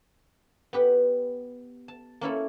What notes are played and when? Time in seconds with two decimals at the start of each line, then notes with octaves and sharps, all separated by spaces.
0.73 B3 G4 B4
1.88 A5
2.21 A#3 C#4 E4 A4